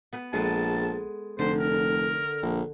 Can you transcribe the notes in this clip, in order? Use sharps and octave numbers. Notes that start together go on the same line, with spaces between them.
B3 B4 B5
A#1 G#3 A4 B4 A5
F1 D3 C5
A#4
A#1